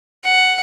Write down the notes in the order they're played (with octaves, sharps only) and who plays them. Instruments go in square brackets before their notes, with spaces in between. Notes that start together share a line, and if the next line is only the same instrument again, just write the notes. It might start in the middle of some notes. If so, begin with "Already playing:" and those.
[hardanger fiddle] F#5